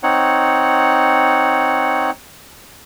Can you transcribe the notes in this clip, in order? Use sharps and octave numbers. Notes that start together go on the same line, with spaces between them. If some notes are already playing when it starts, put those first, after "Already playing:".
C4 D#4 C#5 F#5